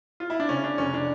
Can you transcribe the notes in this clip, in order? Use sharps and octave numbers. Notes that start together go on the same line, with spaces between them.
F4
E4
D4
C#3 C#4
D4
F1 C#4
D4